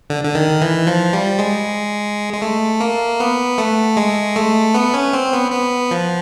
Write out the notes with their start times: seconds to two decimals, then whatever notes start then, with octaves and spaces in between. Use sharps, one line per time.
0.10 D3
0.24 D3
0.35 D#3
0.62 E3
0.87 F3
1.13 G3
1.39 G#3
2.34 G#3
2.42 A3
2.80 A#3
3.20 B3
3.58 A3
3.97 G#3
4.36 A3
4.74 B3
4.94 C#4
5.13 C4
5.33 B3
5.52 B3
5.91 F3